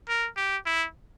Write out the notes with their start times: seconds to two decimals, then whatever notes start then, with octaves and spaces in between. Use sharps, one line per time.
0.08 A#4
0.37 G4
0.66 E4